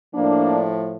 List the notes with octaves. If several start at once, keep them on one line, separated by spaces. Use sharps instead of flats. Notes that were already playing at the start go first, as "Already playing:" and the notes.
A2 F3 A#3 D4